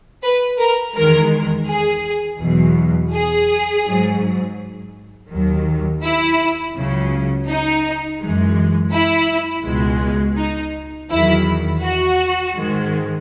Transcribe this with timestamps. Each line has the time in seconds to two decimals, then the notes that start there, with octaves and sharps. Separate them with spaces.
0.23 B4
0.60 A#4
0.96 E2 D#3 G#3 A#4
1.68 G#4
2.41 E2 B2 F#3
3.13 G#4
3.85 G#2 F#3
5.31 D#2 D#3 F#3
6.03 E4
6.75 C#2 C#3 F#3
7.49 D#4
8.21 F#2 E3 G#3
8.92 E4
9.65 C#2 B2 G#3
10.38 D#4
11.11 E2 D#3 F#3 E4
11.83 F#4
12.55 G#2 D#3 G#3